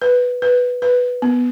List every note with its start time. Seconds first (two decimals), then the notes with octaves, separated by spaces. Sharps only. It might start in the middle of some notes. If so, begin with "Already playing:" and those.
0.02 B4
0.42 B4
0.82 B4
1.22 B3